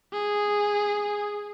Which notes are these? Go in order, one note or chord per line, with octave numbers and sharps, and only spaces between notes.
G#4